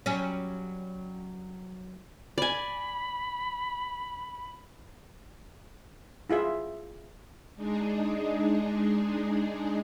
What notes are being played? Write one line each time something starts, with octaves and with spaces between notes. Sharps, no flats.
F#3 G3 C#4
D5 G#5 B5
E4 F4 G#4 E5
G#3 D4 D#4 G#4